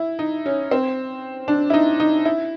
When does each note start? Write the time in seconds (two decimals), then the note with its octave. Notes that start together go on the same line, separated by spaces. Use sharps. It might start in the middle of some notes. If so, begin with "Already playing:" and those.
Already playing: E4
0.19 D#4
0.46 C#4
0.71 C4
1.48 D4
1.70 E4
1.74 D#4
2.00 D#4
2.25 E4